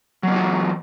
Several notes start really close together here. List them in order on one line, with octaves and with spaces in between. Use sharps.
F#3 A#3 F4 F#4 E3